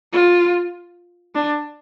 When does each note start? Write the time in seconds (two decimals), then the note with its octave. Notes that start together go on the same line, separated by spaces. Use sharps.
0.13 F4
1.35 D4